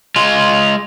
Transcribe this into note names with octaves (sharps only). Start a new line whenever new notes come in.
G#3 F4